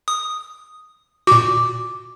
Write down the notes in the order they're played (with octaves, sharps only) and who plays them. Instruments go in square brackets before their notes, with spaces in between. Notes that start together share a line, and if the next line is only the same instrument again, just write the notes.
[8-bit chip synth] D#6
[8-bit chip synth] A#2 F#4 [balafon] D6